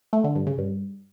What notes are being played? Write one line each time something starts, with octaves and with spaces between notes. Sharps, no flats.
A3
D3
G2
C#3
G2